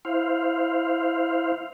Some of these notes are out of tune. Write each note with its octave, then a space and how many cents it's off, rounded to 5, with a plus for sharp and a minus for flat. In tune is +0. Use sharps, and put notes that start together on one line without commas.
E4 +0 C5 +0 F5 +0